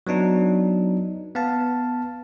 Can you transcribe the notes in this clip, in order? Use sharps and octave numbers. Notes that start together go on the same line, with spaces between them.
F#3 B3 D4 D#4
B3 F5 A5